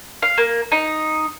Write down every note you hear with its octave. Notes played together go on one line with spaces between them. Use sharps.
F5
A#3
D#4